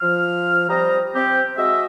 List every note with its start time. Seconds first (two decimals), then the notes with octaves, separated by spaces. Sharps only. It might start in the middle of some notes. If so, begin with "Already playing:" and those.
0.01 F3 F6
0.69 G3 C4 C5 D#5 A#5
1.14 C4 G4
1.57 G#3 F#4 D#5 E5